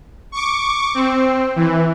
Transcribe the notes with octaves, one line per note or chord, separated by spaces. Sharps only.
C#6 D6
C4
E3